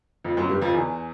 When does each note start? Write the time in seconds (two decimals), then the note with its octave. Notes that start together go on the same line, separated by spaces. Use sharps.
0.24 F2 F3
0.37 F#2 F#3
0.49 G2 G3
0.61 F2 F3
0.74 E2 E3